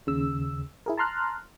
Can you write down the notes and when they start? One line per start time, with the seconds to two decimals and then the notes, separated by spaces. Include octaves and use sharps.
0.07 D#2 C#3 E6
0.86 E4 G#4 A#4
0.98 A5 A#5 C6 F6 F#6